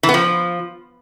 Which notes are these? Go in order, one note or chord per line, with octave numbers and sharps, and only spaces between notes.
E3
B3
F3